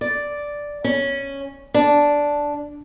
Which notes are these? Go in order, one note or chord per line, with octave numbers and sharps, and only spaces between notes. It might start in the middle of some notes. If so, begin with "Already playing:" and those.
D5
C#4
D4